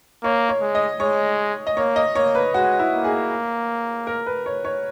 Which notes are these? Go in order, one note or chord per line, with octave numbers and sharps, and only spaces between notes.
A#3 C#5
C#5
G#3
D#5
G#3 C#5
D#5
A#3 C#5
D#5
A#3 C#5
B4
G#3 F#4
E4
A#3
G#4
A#4
B4
C#5
C#5